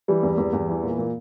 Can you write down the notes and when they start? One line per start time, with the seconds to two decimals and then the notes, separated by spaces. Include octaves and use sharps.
0.08 E3 G3
0.23 E2
0.38 E2
0.53 E2
0.69 E3
0.83 A#2
0.98 A#2